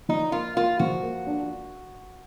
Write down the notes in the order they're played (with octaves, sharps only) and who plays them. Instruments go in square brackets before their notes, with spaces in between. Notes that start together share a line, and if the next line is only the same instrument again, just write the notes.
[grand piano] F3 [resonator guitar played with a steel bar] D#4
[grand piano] A#3 [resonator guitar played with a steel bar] F4
[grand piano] A#3 [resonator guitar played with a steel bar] F4
[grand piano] F3 [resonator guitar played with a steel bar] F#4
[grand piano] A#3
D4